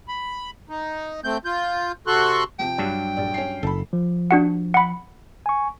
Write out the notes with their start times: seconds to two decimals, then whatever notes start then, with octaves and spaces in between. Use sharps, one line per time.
0.08 B5
0.69 D#4
1.24 A3 C4 G6
1.45 F4 G6
2.07 C3 F#4 A4 C6 C#6 F#6
2.59 C3 F3 G5
2.78 G2 F#3 G3 D4
3.17 D#1 A#1 D5
3.34 C#4 C7
3.63 F#1 A4 B5
3.93 F3
4.31 D4 F#4 F#5
4.74 F#5 B5
5.46 G#5 C#6